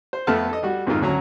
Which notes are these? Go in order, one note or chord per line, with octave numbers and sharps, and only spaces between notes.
C5
F2 A3 B3 C4 A5 F6
A4 D#5
G3 F#4
F2 G#2 D#3 F4
D2 F#3 C#4 A#5